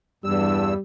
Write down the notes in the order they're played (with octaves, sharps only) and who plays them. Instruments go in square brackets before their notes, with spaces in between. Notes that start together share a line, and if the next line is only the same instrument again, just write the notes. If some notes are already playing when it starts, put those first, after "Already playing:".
[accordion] E2 G2 E6 [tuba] G3